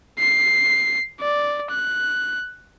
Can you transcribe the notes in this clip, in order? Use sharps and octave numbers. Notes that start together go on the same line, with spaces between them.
C7
D5
F#6